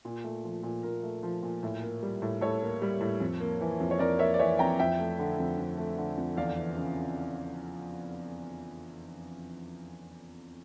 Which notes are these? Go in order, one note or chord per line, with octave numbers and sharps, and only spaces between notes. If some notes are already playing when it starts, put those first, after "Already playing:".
A#2
A3
F3
A#2
A#2 A#4
A3
F3
A#2
A2
A#3
G3
A2
A2 A4 C#5
A#3
G3
A2
F2
A#3
E3
F2
C#5
F2 A#4 D5
A#3 C#5 E5
D5
E3 C#5 E5
F2 G5 A#5
F2 E5 G5
A3
D3
F2
F2
A3
D3
F2
E2 D5 F5
E3
C#3